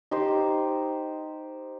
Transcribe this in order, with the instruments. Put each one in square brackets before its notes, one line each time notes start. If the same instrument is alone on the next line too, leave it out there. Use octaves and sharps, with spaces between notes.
[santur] D#4 G4 C5